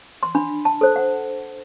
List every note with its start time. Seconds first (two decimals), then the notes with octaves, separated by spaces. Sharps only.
0.23 C6
0.35 D4 B5
0.65 A5
0.81 A4 C5
0.96 F#5